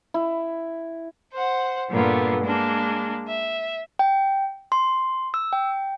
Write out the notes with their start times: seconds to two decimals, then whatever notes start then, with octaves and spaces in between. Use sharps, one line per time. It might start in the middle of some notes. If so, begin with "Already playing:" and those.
0.14 E4
1.33 C5 F#5
1.90 G2 A#2 D3 B3
2.43 G#3 A#3 D4
3.27 E5
3.99 G5
4.72 C6
5.34 E6
5.53 G5